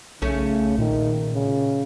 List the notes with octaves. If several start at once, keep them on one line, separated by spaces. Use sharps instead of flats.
B1 C#3 A3 C#4
A#2 D#3
C#3